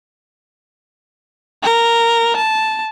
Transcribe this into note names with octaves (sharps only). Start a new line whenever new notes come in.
A#4
A5